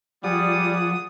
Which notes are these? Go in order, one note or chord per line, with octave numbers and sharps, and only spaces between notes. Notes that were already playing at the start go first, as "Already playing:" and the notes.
F3 G3 G#4 D5 F#5 D#6